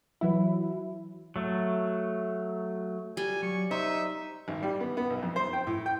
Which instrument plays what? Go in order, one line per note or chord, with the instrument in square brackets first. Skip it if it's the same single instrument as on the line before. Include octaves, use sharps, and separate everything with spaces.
[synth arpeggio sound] E3 F#3 E4
[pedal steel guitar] F#3 A3
[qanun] G3 [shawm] G#5
[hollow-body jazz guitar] F#3 [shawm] C#6
[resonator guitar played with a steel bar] D#4 [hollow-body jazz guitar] C5 [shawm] E5
[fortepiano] G#1
G3
B3
B3
B1
F2
C5
G5
A2
G5